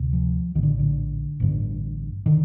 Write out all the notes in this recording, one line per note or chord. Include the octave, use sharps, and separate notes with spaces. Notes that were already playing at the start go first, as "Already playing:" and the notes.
Already playing: D2 C3
F3
A#1 A2 D3 D#3
D3
A1 G2 D3
D3 D#3